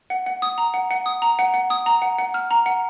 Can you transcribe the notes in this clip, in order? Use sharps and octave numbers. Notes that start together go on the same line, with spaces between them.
F#5
F#5
D#6
A#5
F#5
F#5
D#6
A#5
F#5
F#5
D#6
A#5
F#5
F#5
F6
A#5
F#5